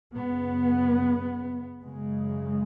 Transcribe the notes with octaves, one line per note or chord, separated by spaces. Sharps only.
F#2 C#3 B3
F#2 C#3 G#3